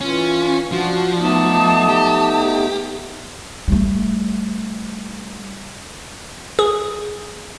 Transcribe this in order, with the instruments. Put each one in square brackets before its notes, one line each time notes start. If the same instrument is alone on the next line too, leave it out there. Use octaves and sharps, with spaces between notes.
[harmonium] E3 F4 [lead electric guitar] C#4
[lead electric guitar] F3 [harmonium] D4 F#4
[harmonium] A3 B3 D#4 [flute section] A5 D6 D#6
[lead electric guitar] G4
[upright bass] G3 A3
[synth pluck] G#4